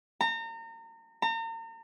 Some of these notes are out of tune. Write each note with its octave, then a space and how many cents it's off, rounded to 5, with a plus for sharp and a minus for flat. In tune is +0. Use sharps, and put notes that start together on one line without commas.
A#5 -35
A#5 -40